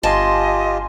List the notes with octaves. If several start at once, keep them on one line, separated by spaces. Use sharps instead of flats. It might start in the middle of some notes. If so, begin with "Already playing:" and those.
G1 F4 G4 D#5 G#5 A5 C6